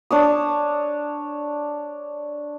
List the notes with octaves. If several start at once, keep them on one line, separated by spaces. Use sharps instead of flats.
D4 C#5 D#6